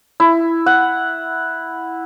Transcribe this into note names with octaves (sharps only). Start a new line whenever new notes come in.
E4
F#5